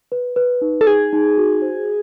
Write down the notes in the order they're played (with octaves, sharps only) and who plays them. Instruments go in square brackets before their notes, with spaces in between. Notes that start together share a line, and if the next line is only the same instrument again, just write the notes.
[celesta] B4
B4
D#4
[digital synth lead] A4
[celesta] D#4 [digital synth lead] G#4
[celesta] D#4
F#4
C5